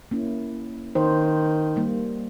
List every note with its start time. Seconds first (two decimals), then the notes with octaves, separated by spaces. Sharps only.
0.11 A#3 C#4 E4
0.95 D#3 C5
1.76 G3 A#3